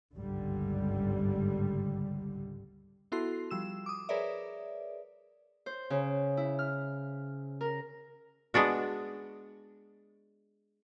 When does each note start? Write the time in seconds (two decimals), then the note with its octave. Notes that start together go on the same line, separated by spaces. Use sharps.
0.14 G1 C#2 G#2 D3 G3
3.12 B3 E4 F#4 A4 C6 C7
3.51 F3 G3 E6 E7
3.86 D6 D#6
4.09 G#4 A#4 B4 C#5 D5 E5
5.66 C5
5.90 C#3
6.37 E4
6.59 F6
7.61 A#4
8.54 G#3 B3 D4 F#4